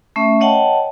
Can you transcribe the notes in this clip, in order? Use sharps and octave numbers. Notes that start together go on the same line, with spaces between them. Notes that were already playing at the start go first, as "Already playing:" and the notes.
A3 C#4 E5
C#5 D#5 F#5 G5 A5